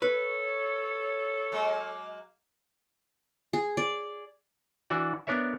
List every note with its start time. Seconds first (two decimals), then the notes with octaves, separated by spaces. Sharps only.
0.02 A4 B4 C#5
1.52 F#3 G#3 A#3
3.53 G#4
3.77 D5
4.90 E3 D4 F#4 D5
5.27 B3 D4 A#4 C#5 E5